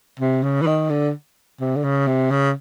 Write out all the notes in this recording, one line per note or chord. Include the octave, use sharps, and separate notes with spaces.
C3
C#3
E3
D#3
D3
C3
D3
C#3
C3
C#3